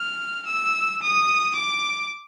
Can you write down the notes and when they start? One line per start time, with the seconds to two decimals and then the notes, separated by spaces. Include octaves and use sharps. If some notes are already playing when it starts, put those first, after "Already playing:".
Already playing: F6
0.47 E6
1.02 D#6
1.56 D6